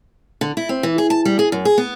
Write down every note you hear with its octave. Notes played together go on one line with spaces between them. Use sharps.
D3
E4
C4
E3
G#4
A5
G3
G#4
F#2
G#4
B3